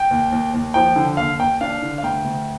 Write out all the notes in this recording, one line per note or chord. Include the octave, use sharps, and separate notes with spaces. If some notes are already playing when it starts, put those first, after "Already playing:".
Already playing: G5
D#2
D#2
D#2
F3 G5
D3
D#2 F5
D#2 G5
D4 F5
D3
F5
D2 G5
D2